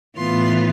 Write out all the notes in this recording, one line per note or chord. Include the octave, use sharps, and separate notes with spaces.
A2 E3 B3 F4 C6